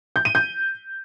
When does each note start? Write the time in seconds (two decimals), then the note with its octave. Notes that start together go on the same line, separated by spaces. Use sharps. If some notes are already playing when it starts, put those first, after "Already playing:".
0.16 G6
0.25 D#7
0.35 G6